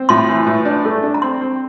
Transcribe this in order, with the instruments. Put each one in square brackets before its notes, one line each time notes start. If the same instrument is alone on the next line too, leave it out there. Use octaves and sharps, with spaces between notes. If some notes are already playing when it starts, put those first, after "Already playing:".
Already playing: [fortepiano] C4
[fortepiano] A2 [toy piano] C6
[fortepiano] E3
A2
D4
A3
D4
[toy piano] A#5
[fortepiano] C4 [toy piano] C6
[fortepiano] C4